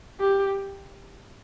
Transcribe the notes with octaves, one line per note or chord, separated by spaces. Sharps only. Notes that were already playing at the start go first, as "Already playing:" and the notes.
G4